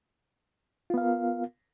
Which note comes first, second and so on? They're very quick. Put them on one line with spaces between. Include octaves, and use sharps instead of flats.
F4 B3 F5 A#4